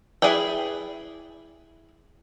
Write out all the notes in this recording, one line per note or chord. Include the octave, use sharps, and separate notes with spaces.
E4 G#4 B4 D5 G5